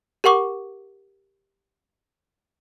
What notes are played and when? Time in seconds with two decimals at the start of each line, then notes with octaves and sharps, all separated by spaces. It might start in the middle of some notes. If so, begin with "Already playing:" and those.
0.24 G4 A#4 F#5 C#6 D6